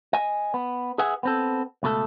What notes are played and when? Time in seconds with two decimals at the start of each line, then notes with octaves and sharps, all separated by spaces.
0.13 D#5 G#5
0.54 B3
0.98 G#4 B4 E5 F#5 G#5
1.23 B3 C4 A4
1.83 C#2 B2 A3 A4